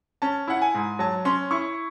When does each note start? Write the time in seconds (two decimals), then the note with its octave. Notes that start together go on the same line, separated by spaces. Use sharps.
0.22 C#4 A5
0.48 E4 F#5
0.62 G#5
0.74 G#2
0.99 F#3 A5
1.25 C#4 C6
1.51 E4 C#6